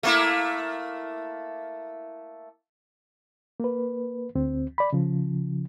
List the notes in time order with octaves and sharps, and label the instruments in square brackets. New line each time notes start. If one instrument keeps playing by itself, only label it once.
[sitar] A3 A#3 E4
[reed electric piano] A#3 B4
D2 C4
D5 B5
C#3 F3